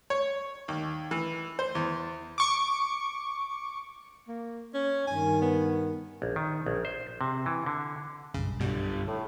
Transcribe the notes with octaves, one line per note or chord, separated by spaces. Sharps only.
C#5
D#2
E3
C5
E2
C#6 D6
A#3
C#4
G2 D#3 G#5
B3
A#1
D#3
A#1
C5
C3
E3
D3
F#1 B1 G2 C#3
B2 D3 G3
A2